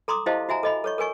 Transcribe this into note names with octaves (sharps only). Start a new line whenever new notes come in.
A4 A#5 C6 D6 D#6
E4 G4 C5 D#5 F5 A5
F#4 E5 G#5 A#5
A4 D#5 B5
A4 C#5 C#6
A4 A#4 G#5 C#6